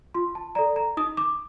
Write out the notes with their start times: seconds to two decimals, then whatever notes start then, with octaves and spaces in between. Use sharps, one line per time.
0.14 F4 C6
0.35 A5
0.55 A4 D5 A#5
0.76 A#5
0.97 D#4 D#6
1.17 D6